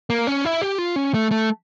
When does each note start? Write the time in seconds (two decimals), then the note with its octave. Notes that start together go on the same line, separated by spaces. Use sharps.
0.10 A#3
0.27 C#4
0.45 E4
0.62 G4
0.78 F4
0.96 C#4
1.14 A3
1.31 A3